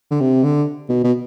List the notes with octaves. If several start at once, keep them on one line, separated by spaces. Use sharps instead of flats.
D3
C3
D3
B2
B2